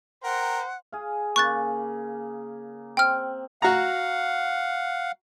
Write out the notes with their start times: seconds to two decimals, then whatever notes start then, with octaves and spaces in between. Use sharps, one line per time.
0.24 A#4 C5 F#5 G5
0.92 G#4 F5
1.36 C#3 A#3 C#6 F#6 A6
2.97 C4 G5 F6
3.62 F#4 F5 F#5 A#5